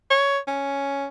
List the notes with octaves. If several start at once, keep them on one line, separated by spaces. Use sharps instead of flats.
C#5
C#4